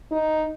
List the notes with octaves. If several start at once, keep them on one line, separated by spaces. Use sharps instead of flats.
D#4